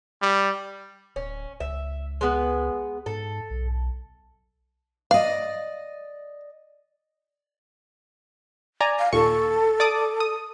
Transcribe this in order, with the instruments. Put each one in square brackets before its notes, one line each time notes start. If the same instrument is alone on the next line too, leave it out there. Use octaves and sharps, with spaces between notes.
[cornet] G3
[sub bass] D1 [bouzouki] C#4
[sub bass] C#2 [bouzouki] E5
[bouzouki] G#3 B3
[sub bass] G#2 [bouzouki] A4
[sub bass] B1
[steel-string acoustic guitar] D5 D#5 [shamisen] F5
[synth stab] D5 G#5 A#5
[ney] F5
[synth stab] D#2 A#2 C#6 [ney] A4
[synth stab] D5 D6 D#6
D#6